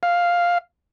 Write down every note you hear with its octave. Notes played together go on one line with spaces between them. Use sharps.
F5